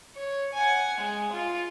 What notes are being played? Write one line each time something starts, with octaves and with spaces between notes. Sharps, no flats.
C#5
F#5 G#5
G#3
F4